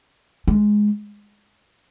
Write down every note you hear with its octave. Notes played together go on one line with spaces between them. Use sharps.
G#3